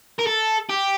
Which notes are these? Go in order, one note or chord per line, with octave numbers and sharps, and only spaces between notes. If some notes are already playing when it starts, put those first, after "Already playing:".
A#4
A4
G4